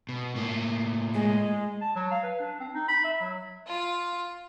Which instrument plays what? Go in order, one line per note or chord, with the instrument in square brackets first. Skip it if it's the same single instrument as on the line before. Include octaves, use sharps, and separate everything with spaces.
[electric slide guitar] B2
A2 A#3
[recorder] G#3
[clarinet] A5
F#3
F5
B4
D4
C4
D#4
B5
E5
F#3
[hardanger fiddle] F4